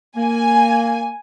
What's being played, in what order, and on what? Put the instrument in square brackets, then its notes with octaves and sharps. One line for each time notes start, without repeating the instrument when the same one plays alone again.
[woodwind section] A#3 [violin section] G#5